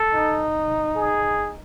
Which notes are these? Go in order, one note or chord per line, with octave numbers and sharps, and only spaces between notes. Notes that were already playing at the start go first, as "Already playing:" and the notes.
Already playing: A4
D#4
G#4